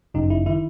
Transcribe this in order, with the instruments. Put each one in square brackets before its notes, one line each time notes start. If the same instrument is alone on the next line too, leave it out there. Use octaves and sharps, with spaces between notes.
[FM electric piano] G1 F#2 C#3 D#4
E4
D#3 E4